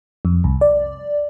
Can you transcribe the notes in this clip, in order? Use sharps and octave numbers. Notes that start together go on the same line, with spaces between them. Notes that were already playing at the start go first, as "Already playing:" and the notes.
F2
C2
D5